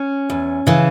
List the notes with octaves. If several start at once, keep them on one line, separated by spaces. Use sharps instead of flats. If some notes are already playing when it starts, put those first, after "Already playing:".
Already playing: C#4
E2
C#3 E3